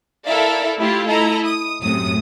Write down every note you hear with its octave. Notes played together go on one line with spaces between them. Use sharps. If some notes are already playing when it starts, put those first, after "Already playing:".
E4 A4 A#4 D5 E5 F5
A3 E4 F4 G4
E4 A4 D#5 A#5
D#6
F#2 A2 C3 D#6